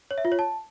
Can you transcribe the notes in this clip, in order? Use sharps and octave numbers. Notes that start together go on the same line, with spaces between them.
C#5
E5
F4
C#5
A5